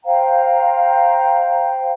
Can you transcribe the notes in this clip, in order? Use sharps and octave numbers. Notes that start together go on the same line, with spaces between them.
C5 F5 G5 A#5